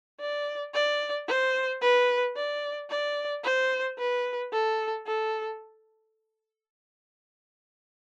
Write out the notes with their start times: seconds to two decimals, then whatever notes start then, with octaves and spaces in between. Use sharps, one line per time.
0.20 D5
0.74 D5
1.28 C5
1.82 B4
2.36 D5
2.90 D5
3.44 C5
3.98 B4
4.52 A4
5.07 A4